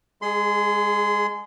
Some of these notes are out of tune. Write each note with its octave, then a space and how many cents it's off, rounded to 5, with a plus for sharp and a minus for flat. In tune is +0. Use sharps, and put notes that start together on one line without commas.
G#3 -25 G#4 +15 C6 -25